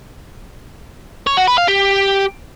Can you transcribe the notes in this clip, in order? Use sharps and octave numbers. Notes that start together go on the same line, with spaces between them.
C#5
F#4
B4
F5
G4